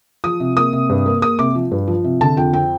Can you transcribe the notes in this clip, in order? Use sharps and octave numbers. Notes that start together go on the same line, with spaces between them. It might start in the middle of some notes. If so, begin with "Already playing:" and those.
F3 D#6
C3
A#3 D#6
C3
G2
A#3
A#3 D#6
C3 D6
F3
G2
F3
C3
D3 A5
F2 G5
C4 G5